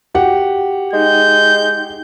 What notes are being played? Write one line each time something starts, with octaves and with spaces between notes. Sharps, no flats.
F#4 G4 F#5
G#3 D#4 G5 G6